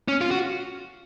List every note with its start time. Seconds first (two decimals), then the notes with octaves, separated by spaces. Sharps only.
0.08 C#4
0.21 F4
0.31 F#4